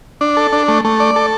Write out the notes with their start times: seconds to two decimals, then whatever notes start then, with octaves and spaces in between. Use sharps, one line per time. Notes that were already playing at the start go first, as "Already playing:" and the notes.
0.21 D4
0.37 A4
0.52 D4
0.68 A3
0.85 A3
1.00 D5
1.16 A4